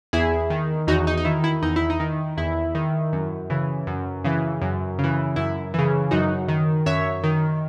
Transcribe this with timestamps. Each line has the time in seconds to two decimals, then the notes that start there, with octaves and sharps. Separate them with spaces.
0.13 E2 E4 G#4
0.50 D#3
0.87 E2 D#4 F#4
1.07 D#4
1.17 D#4
1.25 D#3 E4
1.44 E4
1.63 E2 D#4
1.76 E4
1.90 D#4
2.00 D#3
2.37 E2 E4
2.75 D#3
3.13 F#2
3.50 C#3 E3
3.87 F#2
4.24 C#3 E3
4.61 F#2
4.99 C#3 E3
5.36 F#2 E4
5.74 C#3 E3
6.11 F#2 D#4 F#4
6.48 D#3
6.86 F#2 C#5 E5
7.24 D#3